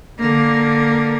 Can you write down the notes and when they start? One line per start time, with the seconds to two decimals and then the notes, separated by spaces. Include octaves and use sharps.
0.19 D3 A#3